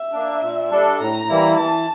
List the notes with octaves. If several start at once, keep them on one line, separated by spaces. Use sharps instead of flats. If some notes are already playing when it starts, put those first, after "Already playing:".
Already playing: E5
A#3 D4
A#2
G3 D4 A4
A2 A#5
E3 G3 A#3 E4
E3 A5